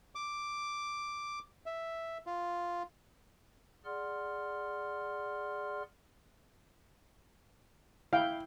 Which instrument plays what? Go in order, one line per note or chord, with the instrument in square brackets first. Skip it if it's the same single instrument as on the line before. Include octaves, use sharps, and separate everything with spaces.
[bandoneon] D6
E5
F4
[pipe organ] G#4 D5 F#5 C6 F6
[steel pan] E4 G5 [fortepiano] F5